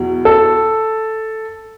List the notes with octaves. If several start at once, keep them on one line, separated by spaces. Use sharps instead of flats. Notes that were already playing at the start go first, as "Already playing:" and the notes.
Already playing: E2 B2 F#3
A4